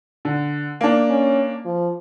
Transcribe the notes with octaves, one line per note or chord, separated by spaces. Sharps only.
D3
A#3 D4
C#4
F3